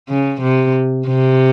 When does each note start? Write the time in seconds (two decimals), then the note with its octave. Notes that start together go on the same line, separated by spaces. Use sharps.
0.09 C#3
0.42 C3
1.08 C3